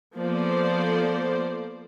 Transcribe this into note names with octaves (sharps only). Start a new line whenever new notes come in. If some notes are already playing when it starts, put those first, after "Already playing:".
F3 A#3 B3 A4 C5 D5